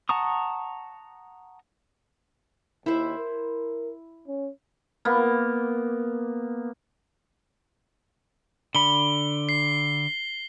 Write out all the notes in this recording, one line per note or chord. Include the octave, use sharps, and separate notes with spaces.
F#5 A5 A#5 C#6 D#6
D#2 E4 C5
A#4
C#4
A#3 B3
D3 B5 G7
C7